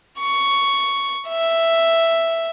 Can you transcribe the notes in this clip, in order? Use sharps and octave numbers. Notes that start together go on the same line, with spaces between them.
C#6
E5